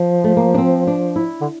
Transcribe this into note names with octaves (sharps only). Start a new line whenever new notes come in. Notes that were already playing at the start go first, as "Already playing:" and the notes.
Already playing: F3
A3
A#3
D4
C4
D4
E4
D3